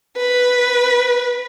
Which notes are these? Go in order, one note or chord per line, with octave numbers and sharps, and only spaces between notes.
B4